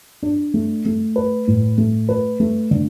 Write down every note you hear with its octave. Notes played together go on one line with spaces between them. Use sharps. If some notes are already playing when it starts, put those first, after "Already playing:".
D4
A3
A3
B4
A2
A3
B4
A3
D3